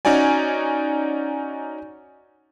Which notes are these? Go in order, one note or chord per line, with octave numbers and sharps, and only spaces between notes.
C#4 D#4 F#4 D5 G#5